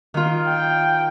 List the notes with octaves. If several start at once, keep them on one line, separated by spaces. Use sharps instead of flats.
D#3 F4
G5